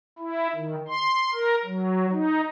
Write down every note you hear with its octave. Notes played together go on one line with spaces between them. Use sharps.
E4
D#3
C6
A#4
F#3
D#4